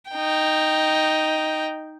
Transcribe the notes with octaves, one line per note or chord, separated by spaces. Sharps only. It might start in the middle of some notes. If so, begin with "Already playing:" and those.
D#4 G5